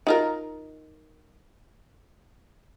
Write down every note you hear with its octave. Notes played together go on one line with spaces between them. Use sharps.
D#4 F4 A#4